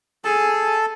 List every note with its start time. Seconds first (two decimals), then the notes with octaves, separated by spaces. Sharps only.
0.25 G#4 A4 A5